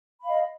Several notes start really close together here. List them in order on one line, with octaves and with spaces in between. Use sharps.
B5 F5 D#5